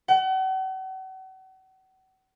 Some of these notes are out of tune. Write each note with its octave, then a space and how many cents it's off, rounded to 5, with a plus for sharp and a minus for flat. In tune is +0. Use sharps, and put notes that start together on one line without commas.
F#5 +40